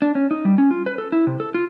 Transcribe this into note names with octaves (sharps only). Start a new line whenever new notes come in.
D4
C#4
D#4
G3
C#4
F4
B4
A4
E4
C3
A4
F4